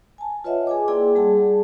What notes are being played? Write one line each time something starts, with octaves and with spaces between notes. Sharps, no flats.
G#5 A5
F4 B4 C#5 D#5 E5 F#5
G#4 G#5 D6
A#3 E4 G#4 D5 G5 C6
G3 G#4 F#5 A5